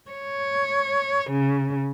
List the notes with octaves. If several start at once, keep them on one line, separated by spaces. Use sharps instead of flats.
C#5
C#3